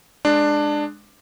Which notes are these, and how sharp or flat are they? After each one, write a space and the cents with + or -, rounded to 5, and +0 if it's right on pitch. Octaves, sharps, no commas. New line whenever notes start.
G#3 +0 D4 +15